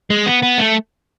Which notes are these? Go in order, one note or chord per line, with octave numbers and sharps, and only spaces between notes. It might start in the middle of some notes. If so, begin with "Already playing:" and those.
G#3
B3
B3
A3